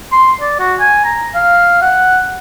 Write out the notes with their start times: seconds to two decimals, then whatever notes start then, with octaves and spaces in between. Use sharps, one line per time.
0.12 C6
0.41 D5
0.60 F#4
0.80 G#5
1.05 A#5
1.35 F5
1.82 F#5